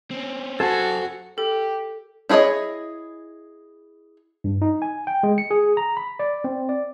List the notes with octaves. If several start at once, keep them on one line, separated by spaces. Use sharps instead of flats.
C4 C#4
F#2 F#4 A4 C5 G#5 A5
G4 A4
D4 E4 G#4 C#5 D#5
G2
D#4
G#5
G5
G#3
C#7
G#4
A#5
B5
D5
C4
D5